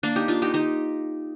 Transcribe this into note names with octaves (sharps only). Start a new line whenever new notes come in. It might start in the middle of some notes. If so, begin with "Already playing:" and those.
A#3 D4
D#4 G4
D4 F4
D#4 G4
D#4 G4